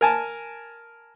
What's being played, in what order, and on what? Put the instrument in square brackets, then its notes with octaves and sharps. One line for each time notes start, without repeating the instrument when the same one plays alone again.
[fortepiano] A#4 G#5 A5